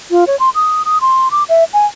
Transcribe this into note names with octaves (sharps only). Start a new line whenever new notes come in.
F4
C#5
C6
D#6
D#6
C6
D6
E5
G#5